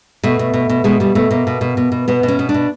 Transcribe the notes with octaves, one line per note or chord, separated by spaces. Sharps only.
B2 A3
B2
B2
B2
B2 G#3
B2 G3
B2 A3
B2 A#3
B2
B2
B2
B2
B2 B3
B2
C#4
B2
D4
B2